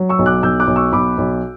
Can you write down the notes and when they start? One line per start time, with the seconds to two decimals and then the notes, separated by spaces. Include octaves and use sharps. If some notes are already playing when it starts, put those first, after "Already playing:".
Already playing: F#3
0.09 C#6 E6
0.19 B1
0.26 D6 F#6
0.43 B1 E6 G6
0.60 D6 F#6
0.67 B1
0.76 C#6 E6
0.92 B1 B5 D6
1.18 B1